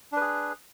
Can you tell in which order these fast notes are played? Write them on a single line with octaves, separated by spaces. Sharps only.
D4 B4 G#4